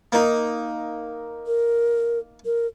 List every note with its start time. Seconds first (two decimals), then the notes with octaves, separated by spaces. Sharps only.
0.12 A#3 D#4
1.47 A#4
2.45 A#4